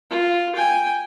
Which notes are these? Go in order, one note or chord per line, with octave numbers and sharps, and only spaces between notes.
F4
G5 G#5